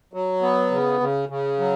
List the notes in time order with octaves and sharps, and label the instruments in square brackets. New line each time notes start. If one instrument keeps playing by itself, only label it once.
[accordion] F#3
B3
C#3
C#3
C#3
F#3